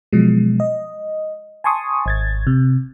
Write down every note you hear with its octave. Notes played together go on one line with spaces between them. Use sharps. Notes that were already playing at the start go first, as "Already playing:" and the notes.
B2 F3 F#3 G#3
D#5
G#5 A5 C6 C#6 D#6
G#1 G#6 A6
C3